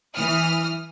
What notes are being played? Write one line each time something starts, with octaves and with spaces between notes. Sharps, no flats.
E3 D#6 F6